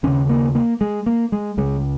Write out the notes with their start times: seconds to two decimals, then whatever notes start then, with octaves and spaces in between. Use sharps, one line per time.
0.03 D#2 C#3 C#4
0.29 A#3
0.55 A#3
0.81 G#3
1.06 A#3
1.32 G#3
1.57 C#2 C#3 G#3